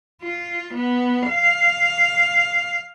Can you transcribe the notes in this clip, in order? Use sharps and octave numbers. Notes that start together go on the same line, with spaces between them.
F4
B3
F5